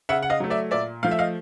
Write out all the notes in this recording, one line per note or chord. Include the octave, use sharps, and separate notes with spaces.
C#3 E5 F#5
F#5
D#5 F5
F#3 A3
D5 E5
A#2 D5 E5
F3 A3 F5
E5
D#5 F5